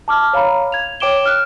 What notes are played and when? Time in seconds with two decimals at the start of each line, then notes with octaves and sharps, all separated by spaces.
0.08 A5 D6 F6
0.33 C#5 F5 A#5 B5
0.72 G#6 F7
1.00 C#5 G5 D6 D7 E7 G7
1.26 F6 F#6